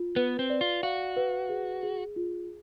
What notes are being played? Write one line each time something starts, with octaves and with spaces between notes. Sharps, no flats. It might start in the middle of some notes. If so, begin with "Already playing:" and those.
Already playing: F4
B3 B4
C4
D5
F4
F#4 F5
B4
G#4
G#4
F4